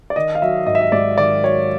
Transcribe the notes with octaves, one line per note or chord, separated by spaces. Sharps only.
D5
D#3 D#5
F5
F#3 E5
G#1 D#5
E5
D#5
G#2 D5
D#3 D5
F#3 C#5